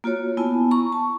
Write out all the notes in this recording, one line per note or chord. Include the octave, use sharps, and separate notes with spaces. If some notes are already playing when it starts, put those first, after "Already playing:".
A#3 F4 F#4 C#5
B3 E4 G#5 A5
A#5 C#6
A5